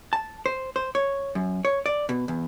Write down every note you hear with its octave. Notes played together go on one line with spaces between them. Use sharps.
A5
C5
C5
C#5
F#2
C#5
D5
B2
E2